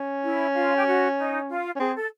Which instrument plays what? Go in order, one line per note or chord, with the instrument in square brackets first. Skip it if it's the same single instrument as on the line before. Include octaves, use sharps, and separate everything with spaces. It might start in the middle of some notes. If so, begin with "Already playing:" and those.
Already playing: [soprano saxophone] C#4
[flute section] E4
F4
G4
F#4
D#4
F4
[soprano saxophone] C#4
[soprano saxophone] C4 [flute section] G#4
[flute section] A4